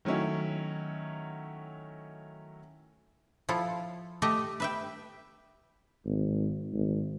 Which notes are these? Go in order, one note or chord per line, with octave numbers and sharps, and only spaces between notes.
D#3 F#3 A3 C#4 E4
F3 E4 F4 A4
A3 G4 D#5 E5
B4 E5 G5
G#1
G#1